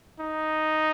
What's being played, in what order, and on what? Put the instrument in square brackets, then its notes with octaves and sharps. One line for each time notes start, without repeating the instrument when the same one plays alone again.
[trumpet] D#4